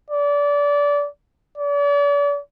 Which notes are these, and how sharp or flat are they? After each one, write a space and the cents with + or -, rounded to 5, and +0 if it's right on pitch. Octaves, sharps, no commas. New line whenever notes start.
D5 -25
D5 -40